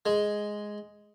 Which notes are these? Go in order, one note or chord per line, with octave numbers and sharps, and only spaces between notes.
G#3